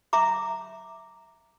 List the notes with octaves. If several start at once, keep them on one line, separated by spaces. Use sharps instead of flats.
E5 A#5 D6